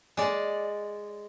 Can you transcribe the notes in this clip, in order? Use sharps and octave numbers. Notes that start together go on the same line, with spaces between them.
G#3 D5